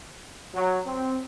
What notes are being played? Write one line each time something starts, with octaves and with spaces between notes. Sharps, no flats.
F#3
C4